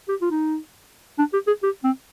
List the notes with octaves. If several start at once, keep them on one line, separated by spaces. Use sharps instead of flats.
G4
F4
D#4
D4
G4
G#4
G4
C4